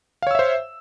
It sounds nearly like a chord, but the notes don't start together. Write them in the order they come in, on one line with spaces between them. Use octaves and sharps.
F5 C#5 E6 E5 C5